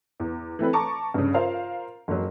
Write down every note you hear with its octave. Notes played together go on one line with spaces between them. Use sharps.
E2
E3 A3 C4 B4
A5 A#5 C#6 D6
G2 C#3
F4 A#4 C5 F5
F#1 F#3